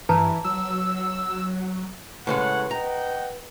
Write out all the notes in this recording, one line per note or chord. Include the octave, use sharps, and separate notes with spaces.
G2 E3 B4 A5 A#5
F#3 E6
A2 C#3 G#3 B4 C#5 F#5
D#5 F#5 G5 A#5